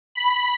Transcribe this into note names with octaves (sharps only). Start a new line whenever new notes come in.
B5